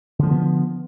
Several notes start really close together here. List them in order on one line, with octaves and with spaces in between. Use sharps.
D3 F3 G#3 B3